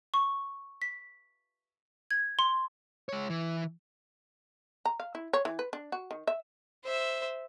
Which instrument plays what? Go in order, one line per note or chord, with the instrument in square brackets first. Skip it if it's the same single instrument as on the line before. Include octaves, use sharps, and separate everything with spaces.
[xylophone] C#6
B6
G#6
C6
[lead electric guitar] G#3 C#5
E3
[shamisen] A#5
F5
E4
C#5
E3
B4
D4
F#4
D#3
E5
[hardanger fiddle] C5 E5